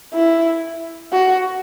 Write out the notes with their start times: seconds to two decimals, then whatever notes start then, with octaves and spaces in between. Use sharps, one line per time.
0.14 E4
1.12 F#4